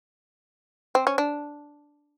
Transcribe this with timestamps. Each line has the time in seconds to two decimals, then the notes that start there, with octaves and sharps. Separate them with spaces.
0.95 C4
1.07 C#4
1.18 D4